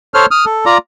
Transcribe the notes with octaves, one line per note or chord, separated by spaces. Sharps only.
A4 C5 C#5 F6
D#6 F6
A4
F4 D5 A#5